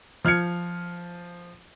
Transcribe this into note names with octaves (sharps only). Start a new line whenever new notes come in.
F3 F6 G#6 C#7